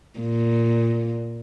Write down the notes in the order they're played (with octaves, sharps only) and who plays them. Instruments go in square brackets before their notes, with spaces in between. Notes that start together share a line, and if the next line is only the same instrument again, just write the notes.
[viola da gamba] A#2